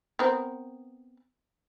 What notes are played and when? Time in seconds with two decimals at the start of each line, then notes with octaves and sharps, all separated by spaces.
0.19 B3 C4 A#4